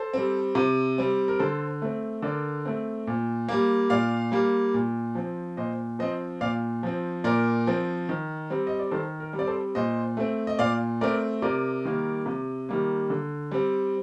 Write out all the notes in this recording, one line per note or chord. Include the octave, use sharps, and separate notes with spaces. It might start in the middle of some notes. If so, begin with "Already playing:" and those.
Already playing: A4 C5
G3 C4
C3
G3 C4
A#4
D3 A4 C5
A3 C4
D3 A#4 D5
A3 C4
A#2
G3 A#3
A#2 D5 F5
G3 A#3
A#2
F3 C4
A#2 C5 D#5
F3 C4 C5 D#5
A#2 D5 F5
F3 C4
A#2 A#4 D5
F3 C4
D#3
G3 C4
D#5
D5
D#3 A4 C5
A#4
G3
C4 D5
A4 C5
A#2 C5 D#5
A3 C4
D#5
A#2 D5 F5
A3 C4 A#4 D5
C3 A#4 D5
D#3 G3 A#3
C3
D#3 G3 A#3
D3
G3 C4